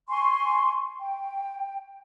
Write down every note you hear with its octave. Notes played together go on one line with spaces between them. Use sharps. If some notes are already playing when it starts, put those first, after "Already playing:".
G#5 C6 C#6
G5